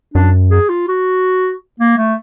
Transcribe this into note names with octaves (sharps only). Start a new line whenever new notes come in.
F#2 D4
G#4
F4
F#4
A#3
A3